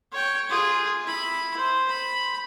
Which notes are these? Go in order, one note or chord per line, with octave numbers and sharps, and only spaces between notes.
C#5 G5
F4 G#4
E4 B5
C5
B5